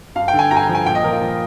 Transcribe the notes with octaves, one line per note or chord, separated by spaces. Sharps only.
G2 F5
G5
D3
G#5
G2 A#5
G#5
A#5
F3
G#5
A#2 G5
D#5
F3 A#4
F4
F3